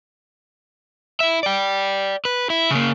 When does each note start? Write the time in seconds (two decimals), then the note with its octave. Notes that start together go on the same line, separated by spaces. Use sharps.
1.20 E4 E5
1.43 D5 G5
2.25 B4
2.50 E4
2.71 C#3 A#3